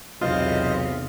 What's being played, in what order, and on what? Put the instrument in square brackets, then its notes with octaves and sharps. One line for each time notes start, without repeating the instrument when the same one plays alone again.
[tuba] B1 [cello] E2 C3 [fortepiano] F4 [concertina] C5 D#5